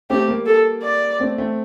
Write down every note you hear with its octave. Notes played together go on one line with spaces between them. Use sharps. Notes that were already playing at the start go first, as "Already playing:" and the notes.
A3 C4 G4
G3 A#3
A4
D5
A3 C4
A3 C4